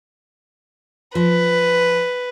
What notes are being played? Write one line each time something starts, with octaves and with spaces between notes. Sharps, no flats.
F3 B4